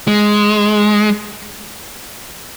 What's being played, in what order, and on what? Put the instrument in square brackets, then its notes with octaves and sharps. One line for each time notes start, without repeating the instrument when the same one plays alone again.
[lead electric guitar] G#3